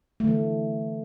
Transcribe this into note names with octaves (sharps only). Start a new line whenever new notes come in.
D3 E3 A3